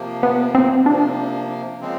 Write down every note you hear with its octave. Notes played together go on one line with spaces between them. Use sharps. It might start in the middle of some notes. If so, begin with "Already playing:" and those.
Already playing: C3 F3 A#3
B3
C4
C3 F3 A#3 D4
C#3 F3 G#3 C4